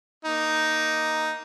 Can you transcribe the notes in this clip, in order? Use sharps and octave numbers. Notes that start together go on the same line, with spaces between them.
A#3 D#4